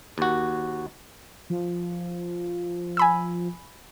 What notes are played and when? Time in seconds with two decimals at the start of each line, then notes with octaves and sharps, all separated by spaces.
0.18 D#2 F#4
1.50 F3
2.97 G#5 B5 E6